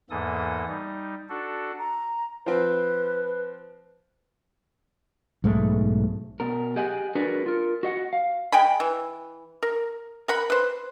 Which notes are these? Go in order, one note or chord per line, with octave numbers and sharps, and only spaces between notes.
E2 G#2 E3 A#3 A4 D#6
G3 D#4
D4 F#4 A4
A#5
F3 C4 B4
B1 G#2 G#3 A3
B2 A#4
G4 G#4 D#5 F#5 G#5
D4 F#4 G#4 A#4 B4 D5
F4 A#4
F#4 D#5 F#5
F5
G#3 G5 G#5 B5
E3
A#4
A#4 F#5 B5
B4 C5